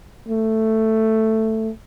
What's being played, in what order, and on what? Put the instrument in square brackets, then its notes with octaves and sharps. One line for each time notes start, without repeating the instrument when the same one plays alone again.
[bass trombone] A3